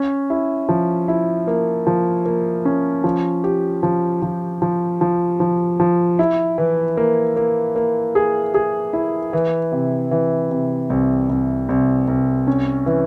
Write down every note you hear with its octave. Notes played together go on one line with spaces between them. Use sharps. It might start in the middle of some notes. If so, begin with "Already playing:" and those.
Already playing: C#4
E4
F3
E4
A#3
F3
A#3
C#4
F3
G4
F3
F3
F3
F3
F3
F3
E4
E3
A#3
A#3
A#3
G#4
G#4
E4
E3
C3
E3
C3
C2
C2
C2
C2
C#4
E3